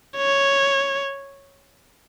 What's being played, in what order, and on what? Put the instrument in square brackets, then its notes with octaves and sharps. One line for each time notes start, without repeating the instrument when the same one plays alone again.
[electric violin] C#5